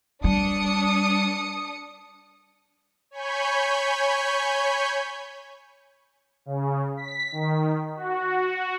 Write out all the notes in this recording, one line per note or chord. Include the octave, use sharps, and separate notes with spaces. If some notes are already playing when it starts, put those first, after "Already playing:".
G3 D4 D#6 C#7
C#5 G#5 B5 C#6 G6
C#3
B6
D#3
F#4